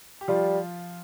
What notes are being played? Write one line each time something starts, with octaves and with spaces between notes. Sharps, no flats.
G4
F3 G3 F4